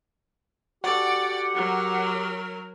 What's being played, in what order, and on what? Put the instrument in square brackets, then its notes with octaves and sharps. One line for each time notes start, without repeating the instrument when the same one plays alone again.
[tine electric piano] F#4 A4 [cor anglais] G4 [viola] D5 [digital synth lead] F#5
[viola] F#3 A#4